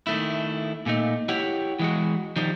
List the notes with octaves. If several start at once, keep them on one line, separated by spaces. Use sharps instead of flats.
D#3 A3 E4
A#2 A3 D#4
E4 G4 C#5 F#5
E3 G#3 F#4
D#3 F3 G3